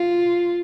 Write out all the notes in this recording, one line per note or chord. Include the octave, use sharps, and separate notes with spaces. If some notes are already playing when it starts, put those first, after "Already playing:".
Already playing: F4